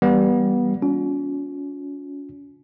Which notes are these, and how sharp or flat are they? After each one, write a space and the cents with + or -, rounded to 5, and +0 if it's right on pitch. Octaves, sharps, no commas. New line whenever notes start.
E3 +0 G3 +0 B3 -20
C#4 +35 F4 +45